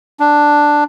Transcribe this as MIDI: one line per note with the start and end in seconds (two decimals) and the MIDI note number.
0.20 0.84 62